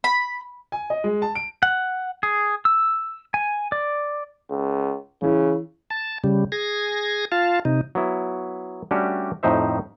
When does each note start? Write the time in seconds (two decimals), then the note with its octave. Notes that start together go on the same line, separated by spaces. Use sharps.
0.04 B5
0.72 G#5
0.90 D#5
1.04 G#3
1.22 A5
1.35 D7
1.63 F#5
2.23 G#4
2.65 E6
3.34 G#5
3.72 D5
4.50 C#2
5.22 C#3 E3 E4
5.90 A5
6.24 C#3 G3
6.52 G#4 G#6 A#6
7.32 F4 F5 A5
7.65 C3 D#4
7.95 F#3 B3 E4
8.91 G3 A3 C#4 D4 F#4 G4
9.43 F2 A2 D#4 C5 E5